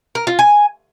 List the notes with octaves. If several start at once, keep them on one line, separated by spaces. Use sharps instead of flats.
A#4
F4
G#5